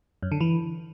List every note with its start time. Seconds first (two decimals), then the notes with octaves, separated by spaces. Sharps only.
0.23 F#2
0.32 D3
0.41 E3